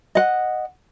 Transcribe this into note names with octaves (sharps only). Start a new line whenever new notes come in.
D#5 F#5